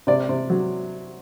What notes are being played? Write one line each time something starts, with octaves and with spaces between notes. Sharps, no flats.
C3 D5
C3
F#3